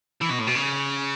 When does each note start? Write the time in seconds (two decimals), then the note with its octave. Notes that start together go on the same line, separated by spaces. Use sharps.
0.22 E3
0.30 B2
0.39 A2
0.47 B2
0.55 C#3